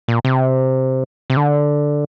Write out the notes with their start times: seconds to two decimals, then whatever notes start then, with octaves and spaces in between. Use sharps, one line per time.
0.08 A#2
0.25 C3
1.30 C3
1.37 D3